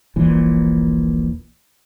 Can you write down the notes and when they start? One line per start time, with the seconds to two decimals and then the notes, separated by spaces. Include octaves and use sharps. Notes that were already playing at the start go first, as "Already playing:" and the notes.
0.16 D#1 A#1 A#2 E3